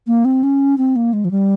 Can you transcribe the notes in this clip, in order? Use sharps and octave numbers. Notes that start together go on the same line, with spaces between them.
A#3
C4
C#4
C4
A#3
G#3
F3
G3